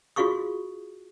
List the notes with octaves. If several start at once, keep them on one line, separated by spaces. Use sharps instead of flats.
F4 F#4 G#4 F5 C#6 D#6